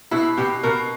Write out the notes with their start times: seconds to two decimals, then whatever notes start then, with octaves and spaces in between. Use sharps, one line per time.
0.11 B2 E4
0.37 B2 G4
0.63 B2 A#4